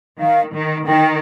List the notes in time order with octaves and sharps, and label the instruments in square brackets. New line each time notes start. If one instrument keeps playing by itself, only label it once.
[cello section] D#3 [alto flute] F5
[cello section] D#3
[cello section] D#3 [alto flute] G5